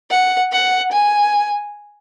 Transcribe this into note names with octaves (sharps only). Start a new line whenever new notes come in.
F#5
F#5
G#5